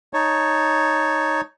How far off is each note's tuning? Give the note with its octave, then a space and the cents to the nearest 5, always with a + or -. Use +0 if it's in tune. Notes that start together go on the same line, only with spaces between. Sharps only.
D#4 +0 C#5 +0 A5 +0